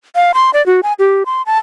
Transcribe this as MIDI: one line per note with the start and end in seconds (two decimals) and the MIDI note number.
0.16 0.32 77
0.34 0.51 84
0.54 0.64 74
0.66 0.81 66
0.83 0.93 80
0.99 1.23 67
1.26 1.42 84
1.46 1.58 81